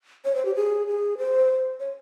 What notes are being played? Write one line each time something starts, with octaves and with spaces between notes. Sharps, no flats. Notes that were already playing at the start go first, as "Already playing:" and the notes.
C#5
C5
G4
G#4
G#4
C5
C#5